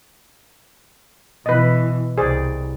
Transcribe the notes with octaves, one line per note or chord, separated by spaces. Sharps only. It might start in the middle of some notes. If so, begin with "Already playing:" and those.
B2 E3 B4 D#5
C2 G#4 C5 D5